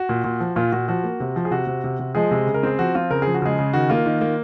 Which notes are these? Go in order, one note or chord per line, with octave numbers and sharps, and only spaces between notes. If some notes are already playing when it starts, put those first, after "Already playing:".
Already playing: F#4
A#2
A#2
F3
A#2 F4
A#2 F#4
F3 F#4
A#3
C3
F3
G#4
C3 F#4
C3
C3
C3
F3 G#3 G#4
C3
C#3
A#4
C4 G#4
F3 F#4
C4 F4
C#3 A#4
F3 G#4
F#4
C#3 G#3 G#4
C#3
D#3 F#4
A#3 F4
D#3
A#3